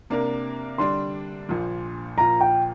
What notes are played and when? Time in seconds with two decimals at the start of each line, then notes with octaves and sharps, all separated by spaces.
0.10 C3 A#3 D4 A#4
0.78 D3 G3 D4 C6
1.49 A#1 A#2 F3
2.17 A#1 A#2 A#3 F4 A#5
2.41 G5